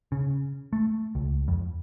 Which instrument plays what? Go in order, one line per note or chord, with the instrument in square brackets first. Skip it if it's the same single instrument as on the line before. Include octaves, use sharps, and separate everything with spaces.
[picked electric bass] C#3
A3
C#2
F2